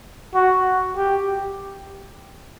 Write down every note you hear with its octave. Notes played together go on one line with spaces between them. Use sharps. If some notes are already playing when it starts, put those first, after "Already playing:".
F#4
G4